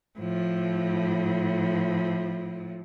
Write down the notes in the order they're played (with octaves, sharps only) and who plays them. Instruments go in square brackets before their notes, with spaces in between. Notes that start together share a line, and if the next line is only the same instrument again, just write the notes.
[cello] A2 F3